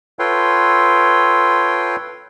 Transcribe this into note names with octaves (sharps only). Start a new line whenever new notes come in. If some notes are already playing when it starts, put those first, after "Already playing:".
F4 A4 B4 C#5 G5 C6